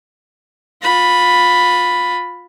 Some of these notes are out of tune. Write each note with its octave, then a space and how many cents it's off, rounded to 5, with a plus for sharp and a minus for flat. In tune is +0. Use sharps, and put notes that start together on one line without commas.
F4 +25 B5 +0